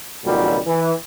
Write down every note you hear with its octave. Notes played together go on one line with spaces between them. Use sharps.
G#1 C#2 A#2 F#3 G3
E3